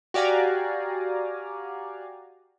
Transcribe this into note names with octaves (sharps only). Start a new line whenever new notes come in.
F#4 G4 D5 F5 G#5 A#5